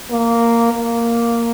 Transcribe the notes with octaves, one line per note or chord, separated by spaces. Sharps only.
A#3
A#3